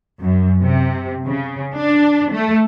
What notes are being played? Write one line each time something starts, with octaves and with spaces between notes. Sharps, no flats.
F#2
C3
C#3
D4
A3